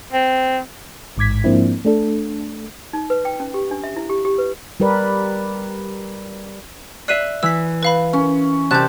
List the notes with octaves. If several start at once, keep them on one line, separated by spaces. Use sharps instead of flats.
C4
A1 G#2 D6 G#6 B6
G#2 F3 A#3 C4 D4 E4
A3 D4 A4
D#4
B4
G5
C#4
G4
D4
E5
E4
G4
G4
B4
G3 G4 A#4 B4 D5
D5 E5 F#6 C7 D#7
E3 E6 B6
B4 F5 B5
C#4
C3 G4 C5 D5 A5 F#6 G6